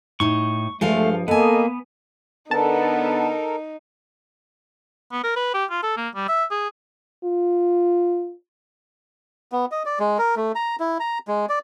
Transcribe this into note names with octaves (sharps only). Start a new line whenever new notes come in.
A2 D#4 C#6
G2 F3 G#3 A3 A4 F5
A#3 B3 A4 D#5 F#5 G#5
D3 B3 D#4 A4 A#4 A5
B3
A#4
B4
G4
F4
A4
A#3
G3
E5
G#4
F4
B3
D#5
D5
G#3
A#4
A3
A#5
E4
A#5
G#3
D5